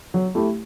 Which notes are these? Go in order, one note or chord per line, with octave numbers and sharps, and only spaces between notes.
F#3
A3 E4 G4